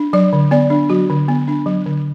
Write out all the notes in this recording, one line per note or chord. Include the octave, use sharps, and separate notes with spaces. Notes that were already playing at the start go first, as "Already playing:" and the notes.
Already playing: D4
F#3 D5
D3
B3 D5
D4
F#3 F#4
D3
B3
D4
F#3
D3